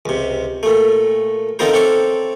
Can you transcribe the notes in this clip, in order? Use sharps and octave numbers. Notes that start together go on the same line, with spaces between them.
C#2 C3
A#2 A3
D3 C4 D#4 F4 A#4 C5
C4 A4 C#5 D5 E5